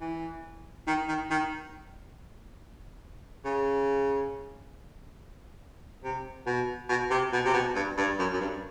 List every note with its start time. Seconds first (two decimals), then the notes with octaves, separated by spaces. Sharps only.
0.01 E3
0.87 D#3
1.08 D#3
1.30 D#3
3.45 C#3
6.04 C3
6.46 B2
6.89 B2
7.10 C3
7.33 B2
7.45 C3
7.53 B2
7.75 G2
7.97 G2
8.19 F#2
8.33 F#2
8.40 G2